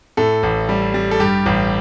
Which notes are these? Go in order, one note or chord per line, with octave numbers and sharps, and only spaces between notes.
A2 A4
A1
G3
G3
A4
G2 G4
A1